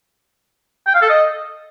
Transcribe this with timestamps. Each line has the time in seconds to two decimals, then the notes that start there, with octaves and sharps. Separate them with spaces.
0.87 G5
0.94 F5
1.02 A4
1.09 D#5